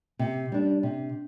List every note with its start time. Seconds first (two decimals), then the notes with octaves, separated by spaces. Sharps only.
0.19 C3
0.52 G3 D4
0.83 C3